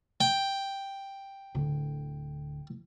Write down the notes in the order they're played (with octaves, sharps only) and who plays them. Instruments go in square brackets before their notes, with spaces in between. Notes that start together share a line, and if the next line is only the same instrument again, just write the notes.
[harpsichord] G5
[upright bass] D1 D3